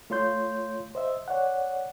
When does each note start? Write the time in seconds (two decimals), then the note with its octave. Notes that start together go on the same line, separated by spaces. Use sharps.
0.10 A3 F4 C#5 C6 G6
0.95 C5 D#5 E5
1.28 C#5 D5 F#5